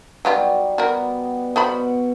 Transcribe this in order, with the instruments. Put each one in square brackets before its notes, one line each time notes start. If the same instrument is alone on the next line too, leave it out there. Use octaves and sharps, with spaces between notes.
[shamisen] F#3 B3 F4 [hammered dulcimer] G3 D#4 F#4
[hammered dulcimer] B3 [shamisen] F#4 A#4
[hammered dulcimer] B2 F#5 [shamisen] B3 C5 B5